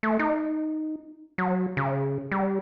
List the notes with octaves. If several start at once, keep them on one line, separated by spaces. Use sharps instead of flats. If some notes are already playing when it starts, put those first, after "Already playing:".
A3
D#4
F#3
C#3
G3